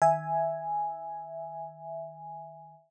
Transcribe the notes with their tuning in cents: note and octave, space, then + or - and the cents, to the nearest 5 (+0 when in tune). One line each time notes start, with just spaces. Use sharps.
D#3 +0 E5 +0 G#5 +0